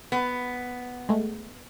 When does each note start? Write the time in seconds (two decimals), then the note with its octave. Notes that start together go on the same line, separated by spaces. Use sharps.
0.12 B3
1.09 G#3 A3